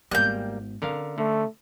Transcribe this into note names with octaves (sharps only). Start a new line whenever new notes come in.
G#1 G3 A#3 B3 F#6 G6
D3 C4 C#4 A#4 F5
D3 A3